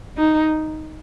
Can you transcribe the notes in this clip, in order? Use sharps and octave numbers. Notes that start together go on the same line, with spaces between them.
D#4